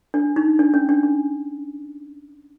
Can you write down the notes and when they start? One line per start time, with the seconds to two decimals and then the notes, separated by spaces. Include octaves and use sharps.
0.14 D4
0.36 D#4
0.59 D4
0.74 C#4
0.89 D4
1.03 D4